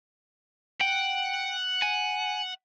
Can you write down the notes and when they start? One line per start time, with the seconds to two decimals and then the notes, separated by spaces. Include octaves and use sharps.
0.81 F#5 G5
1.82 G#5